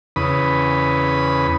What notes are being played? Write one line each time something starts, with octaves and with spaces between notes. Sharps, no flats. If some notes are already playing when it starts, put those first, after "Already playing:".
E2 C#3 B4 B5 D#6